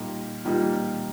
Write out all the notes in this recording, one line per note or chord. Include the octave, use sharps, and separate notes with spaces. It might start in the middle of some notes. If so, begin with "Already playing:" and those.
Already playing: A#2 G3 A#3 D#4
A#2 G3 A#3 D#4